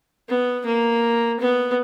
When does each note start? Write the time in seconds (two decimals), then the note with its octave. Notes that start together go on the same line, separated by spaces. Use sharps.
0.29 B3
0.65 A#3
1.39 B3